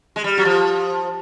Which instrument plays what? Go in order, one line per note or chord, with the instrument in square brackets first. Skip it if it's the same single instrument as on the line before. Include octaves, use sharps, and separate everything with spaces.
[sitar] G#3
G3
F#3
F3